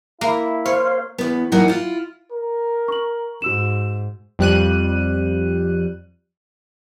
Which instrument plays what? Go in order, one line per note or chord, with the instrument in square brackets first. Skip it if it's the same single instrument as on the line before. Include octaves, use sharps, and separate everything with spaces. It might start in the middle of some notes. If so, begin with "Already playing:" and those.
[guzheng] A#3 [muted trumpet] E4
[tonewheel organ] C5 F5 [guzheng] C#5
[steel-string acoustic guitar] E2 B3
E3 F#3 A#3 D#4 F#4
E4 F4
[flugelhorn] A#4
[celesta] C#6 F#7
[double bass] G#2 [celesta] F#4 E6 E7
[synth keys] F2 G3 F#6 D#7